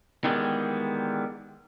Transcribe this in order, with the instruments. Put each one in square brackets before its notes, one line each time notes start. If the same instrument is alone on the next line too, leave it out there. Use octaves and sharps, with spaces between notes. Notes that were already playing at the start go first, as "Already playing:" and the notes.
[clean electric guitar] D#3 E3 G3 G#3 B3